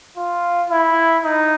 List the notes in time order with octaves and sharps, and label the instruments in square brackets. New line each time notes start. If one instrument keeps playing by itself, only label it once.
[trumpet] F4
E4
D#4